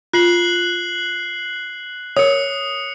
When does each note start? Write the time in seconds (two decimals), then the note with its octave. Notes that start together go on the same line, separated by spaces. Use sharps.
0.14 F4 F#6 C7 F#7
2.17 A#4 C#5 D#6 C#7